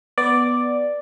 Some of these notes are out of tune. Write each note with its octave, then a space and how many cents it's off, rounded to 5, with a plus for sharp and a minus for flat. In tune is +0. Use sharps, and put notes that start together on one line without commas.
B3 +0 D5 +0